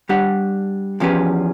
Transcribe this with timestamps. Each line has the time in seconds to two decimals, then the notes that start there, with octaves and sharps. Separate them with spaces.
0.09 G3 D4 G4 F#5
1.00 E2 F3 C#4 G4 B4